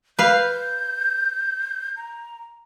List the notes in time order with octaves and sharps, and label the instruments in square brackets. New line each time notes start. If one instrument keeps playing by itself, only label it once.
[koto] B4 F5 [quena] G6
[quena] A#5